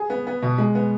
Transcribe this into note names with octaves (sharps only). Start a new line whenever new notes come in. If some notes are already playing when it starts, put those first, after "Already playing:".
Already playing: G#4
B3
B3
B2
G#3
B3